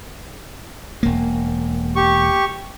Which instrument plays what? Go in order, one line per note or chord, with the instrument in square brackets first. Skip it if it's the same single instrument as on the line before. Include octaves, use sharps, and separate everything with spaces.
[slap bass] E1 A#3
[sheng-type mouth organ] G4 C#6